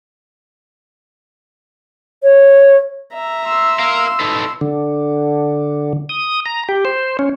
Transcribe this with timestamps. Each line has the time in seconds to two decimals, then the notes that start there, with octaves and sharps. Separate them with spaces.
2.23 C#5
3.14 E5 A#5
3.45 C6 E6
3.79 A#4 F5
4.20 D#4 A4 B4
4.61 D3
6.09 D#6
6.46 A#5
6.69 G4
6.85 C5
7.19 C#4